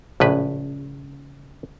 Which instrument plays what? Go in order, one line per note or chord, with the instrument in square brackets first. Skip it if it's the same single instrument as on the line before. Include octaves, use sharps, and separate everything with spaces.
[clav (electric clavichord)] A#1 A2 B4 [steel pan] C#3